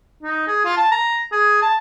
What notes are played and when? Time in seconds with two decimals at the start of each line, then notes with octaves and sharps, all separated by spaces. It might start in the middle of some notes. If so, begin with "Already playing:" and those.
0.22 D#4
0.47 G#4
0.65 F4
0.77 A5
0.91 A#5
1.32 G#4
1.62 A5